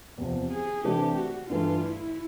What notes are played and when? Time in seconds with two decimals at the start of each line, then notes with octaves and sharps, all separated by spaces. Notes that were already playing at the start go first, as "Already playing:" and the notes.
0.18 E2 C3 F3
0.51 G#4
0.84 C3 E3 A3 D4 G4
1.17 F#4
1.50 G2 E3 A3 F4
1.82 E4